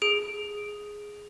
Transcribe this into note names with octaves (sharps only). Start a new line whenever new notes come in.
G#4 D7